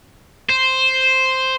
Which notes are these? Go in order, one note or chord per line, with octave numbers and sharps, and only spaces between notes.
C5